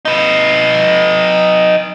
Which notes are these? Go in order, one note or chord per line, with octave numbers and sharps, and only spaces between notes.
D#4 B4